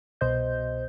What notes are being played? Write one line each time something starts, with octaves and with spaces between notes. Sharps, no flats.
C2 B2 C5 D#5 G6